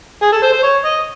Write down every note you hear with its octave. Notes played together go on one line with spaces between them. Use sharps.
G#4
A4
C5
C5
C#5
D#5